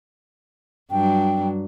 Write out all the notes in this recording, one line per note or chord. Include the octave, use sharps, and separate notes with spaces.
G2 F#3 D4 G5